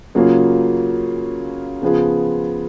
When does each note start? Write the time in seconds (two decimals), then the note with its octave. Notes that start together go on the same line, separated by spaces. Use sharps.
0.15 C#3 F#3 A#3 F4 G#4
1.82 C#3 F3 B3 F4 G#4